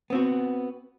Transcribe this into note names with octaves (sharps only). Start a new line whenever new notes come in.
B3 C4 F#4